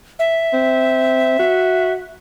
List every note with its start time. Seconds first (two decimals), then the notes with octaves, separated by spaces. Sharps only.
0.19 E5
0.53 C4
1.39 F#4